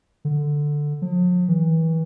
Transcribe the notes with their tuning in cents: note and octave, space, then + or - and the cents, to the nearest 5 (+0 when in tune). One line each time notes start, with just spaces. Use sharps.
D3 +5
F3 +45
E3 -30